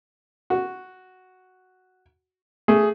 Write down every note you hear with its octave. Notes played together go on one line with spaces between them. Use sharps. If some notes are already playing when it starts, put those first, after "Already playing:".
F#4
A3 G#4